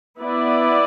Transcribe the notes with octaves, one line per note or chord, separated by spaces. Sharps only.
B3 E4 B4 D5